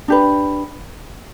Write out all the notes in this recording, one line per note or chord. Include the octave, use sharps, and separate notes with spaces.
D4 G4 B4